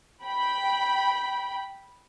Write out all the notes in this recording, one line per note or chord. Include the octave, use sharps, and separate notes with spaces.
G5 B5